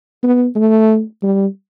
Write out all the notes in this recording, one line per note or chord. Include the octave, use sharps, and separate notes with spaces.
B3
A3
G3